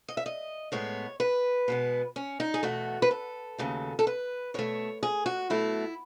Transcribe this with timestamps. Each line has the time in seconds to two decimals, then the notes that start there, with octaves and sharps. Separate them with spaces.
0.08 D#5
0.17 E5
0.26 D#5
0.72 A2 G#3 B3 C#5
1.20 B4
1.68 B2 G#3 B3
2.16 C#4
2.40 D#4
2.54 G#4
2.63 E2 B2 A3 F#4
3.02 B4
3.11 A4
3.58 D#2 C#3 F#3 A3
3.99 A4
4.07 B4
4.54 B2 A3 C#5
5.03 G#4
5.26 F#4
5.50 B2 F#3 A3 E4